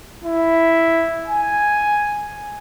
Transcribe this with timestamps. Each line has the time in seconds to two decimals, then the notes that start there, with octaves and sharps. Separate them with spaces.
0.24 E4
1.28 G#5